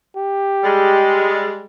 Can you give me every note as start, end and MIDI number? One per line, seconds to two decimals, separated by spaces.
0.16 1.37 67
0.64 1.64 55
0.64 1.64 56